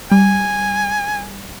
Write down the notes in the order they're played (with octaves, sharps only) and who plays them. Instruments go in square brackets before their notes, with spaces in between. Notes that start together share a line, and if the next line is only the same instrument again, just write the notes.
[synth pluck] G3 [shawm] G#5